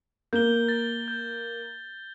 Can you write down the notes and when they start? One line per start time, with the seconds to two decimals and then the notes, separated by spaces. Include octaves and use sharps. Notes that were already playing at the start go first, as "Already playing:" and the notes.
0.33 A#3 G6 G7
0.69 A6
1.08 G6